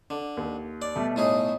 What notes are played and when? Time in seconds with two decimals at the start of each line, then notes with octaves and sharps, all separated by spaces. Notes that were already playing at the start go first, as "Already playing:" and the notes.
0.10 D3
0.37 D#2
0.82 D5
0.95 B2 G3 A3
1.16 A2 D#4 G#4